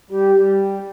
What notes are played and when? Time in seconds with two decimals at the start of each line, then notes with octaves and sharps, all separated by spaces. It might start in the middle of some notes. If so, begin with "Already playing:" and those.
0.10 G3 G4
0.35 G3